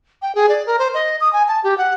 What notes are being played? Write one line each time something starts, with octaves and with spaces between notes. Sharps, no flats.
G5
G#4
D5
A#4
C5
D#5
D#6
G#5
A5
G4
F#5